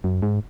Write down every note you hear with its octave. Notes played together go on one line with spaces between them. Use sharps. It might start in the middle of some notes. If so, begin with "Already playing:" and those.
F#2
G#2